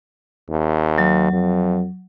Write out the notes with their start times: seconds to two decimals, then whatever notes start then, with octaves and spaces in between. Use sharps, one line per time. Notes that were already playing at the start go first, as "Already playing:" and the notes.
0.50 D#2
0.98 F#3
1.32 F2